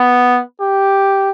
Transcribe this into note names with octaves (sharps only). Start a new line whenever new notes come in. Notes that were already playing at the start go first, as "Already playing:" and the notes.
Already playing: B3
G4